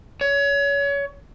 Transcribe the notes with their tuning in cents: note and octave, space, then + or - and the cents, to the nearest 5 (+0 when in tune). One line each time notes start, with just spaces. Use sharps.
C#5 +30